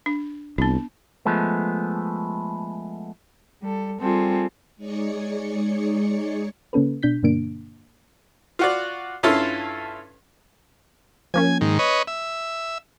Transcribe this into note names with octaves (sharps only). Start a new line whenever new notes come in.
D4
C2 B3 D4
F3 G#3 A3 B3
G3 A4
G3 C4 F4 G#4 A4
G#3 D#4 G#4 C#5 D5 C#7
C#3 A#3 C#4 A4 B4
B2 D4 G6 B6
G2 B2 D3 A#3 D4 D7
F4 F#4 D5
G2 C#4 E4 F4 A4 C6
F3 A#3 C#4 G#5
G#2 D#3
B4 C#5 D#5
E5